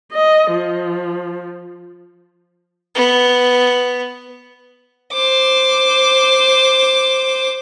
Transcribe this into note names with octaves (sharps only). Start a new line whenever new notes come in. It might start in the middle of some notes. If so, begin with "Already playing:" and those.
D#5
F3
B3
C5 D6